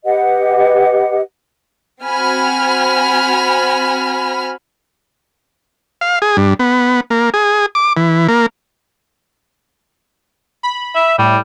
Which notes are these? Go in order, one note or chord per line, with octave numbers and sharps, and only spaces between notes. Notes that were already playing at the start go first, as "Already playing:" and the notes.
G4 B4 D#5 F#5
C4 F#4 G#5 B5 F6
F5
G#4
G2
B3
A#3
G#4
D6
E3
A#3
B5
E5
A2 G3